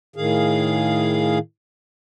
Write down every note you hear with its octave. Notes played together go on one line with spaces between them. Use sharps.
A2 D#3 G#4 F5